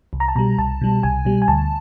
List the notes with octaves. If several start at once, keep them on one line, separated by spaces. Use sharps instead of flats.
C2
A#5
A5
B2 G3 A#5
C2 A5
B2 G3
C2 G#5
B2 G3
G#5
D2 A5